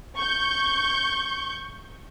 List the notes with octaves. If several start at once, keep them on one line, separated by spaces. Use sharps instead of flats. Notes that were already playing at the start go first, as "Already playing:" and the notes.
C#6 G6